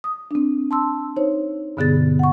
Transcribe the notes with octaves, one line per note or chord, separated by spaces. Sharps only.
D#6
C4 D4
A5 C6 E6
D#4 C5 C#5
G2 B2 D3 B3 G#4 A6
F#5 C#6